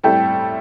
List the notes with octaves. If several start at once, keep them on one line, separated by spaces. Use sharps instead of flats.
A2 G3 C4 E4 A4 G5